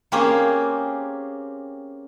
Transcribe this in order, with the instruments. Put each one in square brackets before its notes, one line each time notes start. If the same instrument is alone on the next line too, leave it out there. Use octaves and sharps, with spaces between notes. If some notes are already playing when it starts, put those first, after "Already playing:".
[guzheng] A#3 C4 C#4 G4 G#4